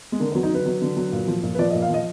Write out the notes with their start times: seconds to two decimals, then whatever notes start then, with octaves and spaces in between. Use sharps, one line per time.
0.12 G#3
0.20 D3 A#3
0.32 B3
0.35 F#3
0.43 D#4
0.51 D3 B4
0.66 F#3
0.82 D3
0.97 F#3
1.13 A#2
1.28 F3
1.43 A#2
1.55 B4
1.59 F3 D5
1.70 D#5
1.75 A#2
1.82 F5
1.89 F3 D#5